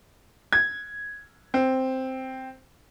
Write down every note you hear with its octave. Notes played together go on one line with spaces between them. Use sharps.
G#6
C4